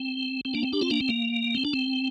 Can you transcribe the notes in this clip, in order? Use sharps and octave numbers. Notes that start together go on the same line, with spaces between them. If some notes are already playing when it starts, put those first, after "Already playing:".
Already playing: C4
C4
A#3 D4
C4
D4 G4
C4 F4
A#3 D4
C4
A#3
C4
D4
C4